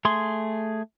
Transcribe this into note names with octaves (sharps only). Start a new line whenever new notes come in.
A3 G#4 C6